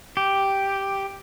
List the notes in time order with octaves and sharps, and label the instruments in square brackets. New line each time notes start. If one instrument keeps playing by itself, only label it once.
[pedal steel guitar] G4